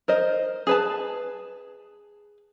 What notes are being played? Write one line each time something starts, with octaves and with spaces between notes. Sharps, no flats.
A#4 C5 D#5
G#4 B4 A5